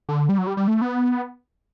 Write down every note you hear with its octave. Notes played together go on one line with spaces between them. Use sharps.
D3
G3
F#3
G3
G3
A3
B3